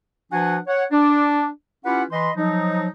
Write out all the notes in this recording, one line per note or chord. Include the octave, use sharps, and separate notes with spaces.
F3 D4 F#4 B4 F#5 G#5
C#5 F#5
D4
C#4 E4 F4 G4 B4 F#5
E3 D#5 B5 C6
F3 F#3 D#4